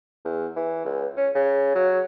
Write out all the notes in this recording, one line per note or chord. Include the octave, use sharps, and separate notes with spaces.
E2
E3
C#2
C#4
C#3
F#3